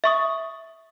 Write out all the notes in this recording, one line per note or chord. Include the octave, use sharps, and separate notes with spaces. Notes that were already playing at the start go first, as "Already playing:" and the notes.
E5 C#6 D#6